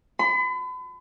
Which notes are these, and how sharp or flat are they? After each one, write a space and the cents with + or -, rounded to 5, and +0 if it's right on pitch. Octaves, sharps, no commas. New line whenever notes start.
B5 +40